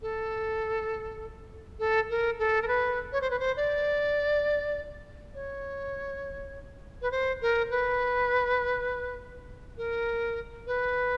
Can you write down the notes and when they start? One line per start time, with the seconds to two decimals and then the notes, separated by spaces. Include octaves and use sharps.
0.02 A4
1.79 A4
2.10 A#4
2.39 A4
2.62 A#4
2.68 B4
3.12 C#5
3.21 C5
3.31 B4
3.39 C5
3.57 D5
5.34 C#5
7.02 B4
7.11 C5
7.42 A#4
7.71 B4
9.78 A#4
10.67 B4